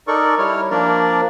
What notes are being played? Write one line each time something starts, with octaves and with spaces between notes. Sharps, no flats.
D#4 A4 A#4 D5 C#6
G3 E4 C#5 F6
F3 A#3 D4 A#4 D5